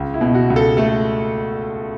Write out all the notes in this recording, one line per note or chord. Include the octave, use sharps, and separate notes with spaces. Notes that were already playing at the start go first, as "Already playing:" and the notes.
Already playing: C#2
E4
B2
F#4
C#2
A4
A3 A4